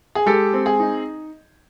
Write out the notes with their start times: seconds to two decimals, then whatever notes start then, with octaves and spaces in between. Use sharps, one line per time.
0.15 G#4
0.26 G#3 G4 A4
0.53 C4
0.66 G#4
0.80 D#4